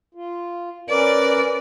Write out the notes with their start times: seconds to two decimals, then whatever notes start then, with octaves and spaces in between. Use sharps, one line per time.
0.15 F4
0.89 C#4 A#4 B4 D5